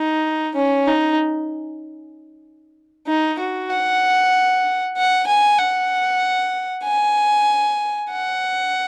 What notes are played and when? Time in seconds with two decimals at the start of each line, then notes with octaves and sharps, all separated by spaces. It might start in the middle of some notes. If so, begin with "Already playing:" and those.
Already playing: D#4
0.56 C#4
0.87 D#4
3.07 D#4
3.39 F#4
3.70 F#5
4.97 F#5
5.27 G#5
5.58 F#5
6.84 G#5
8.11 F#5